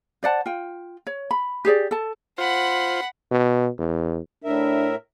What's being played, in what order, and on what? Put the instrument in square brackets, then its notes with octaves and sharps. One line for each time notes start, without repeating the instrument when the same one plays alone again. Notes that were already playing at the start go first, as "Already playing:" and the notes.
[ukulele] C5 D5 F#5 A5
F4 G5
C#5
B5
G4 G#4 C#5 D5
A4 A5
[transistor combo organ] F4 C5 [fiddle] F#5 B5
[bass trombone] B2
E2
[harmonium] A2 A#4 E5 [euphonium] D4